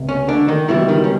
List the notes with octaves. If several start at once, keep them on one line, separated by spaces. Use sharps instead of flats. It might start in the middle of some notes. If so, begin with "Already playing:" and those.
Already playing: C#2 C3
C#4
D3 D4
D#3 D#4
C#2 B2 E3 G3 E4
D#3 D#4
C#4